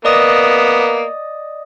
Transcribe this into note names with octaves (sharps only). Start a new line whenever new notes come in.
A#3 B3 D5 D#5 D#6